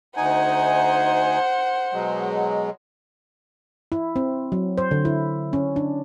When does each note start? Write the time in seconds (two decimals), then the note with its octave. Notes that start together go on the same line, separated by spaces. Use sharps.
0.16 D2 D#4 C5 F#5 G#5
1.93 B2 F#3 G#3
3.92 E4
4.16 C4
4.52 F#3
4.78 C5
4.91 D3
5.05 E4
5.53 C#4
5.76 D4